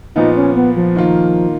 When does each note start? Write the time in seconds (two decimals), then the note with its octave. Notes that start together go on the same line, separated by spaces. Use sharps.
0.15 A#2 F3 B3 D#4
0.37 C#4
0.56 B3
0.76 F3
0.96 D#3 A#3 F4